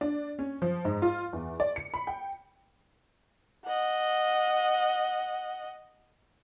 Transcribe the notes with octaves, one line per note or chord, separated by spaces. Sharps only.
D4
C#4
F3
G#2
F4
E2
D5
C#7
B5
G5
D#5 F#5